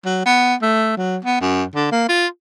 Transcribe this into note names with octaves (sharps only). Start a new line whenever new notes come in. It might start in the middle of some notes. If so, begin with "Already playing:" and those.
F#3
B3
A3
F#3
B3
F#2
D3
A#3
F4